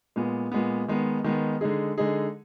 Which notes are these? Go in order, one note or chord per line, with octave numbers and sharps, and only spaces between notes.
A#2 G#3 B3
A#2 G#3 B3
D#3 G#3 B3
D#3 G#3 B3
D3 G#3 D#4 G#4
D3 G#3 D#4 G#4